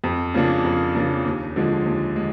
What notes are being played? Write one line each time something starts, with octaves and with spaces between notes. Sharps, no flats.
F2
C#3 F3 A#3 D4
F2
C#3 F3 A#3 D4
D#2
D3 F3 G#3
D#2
G#3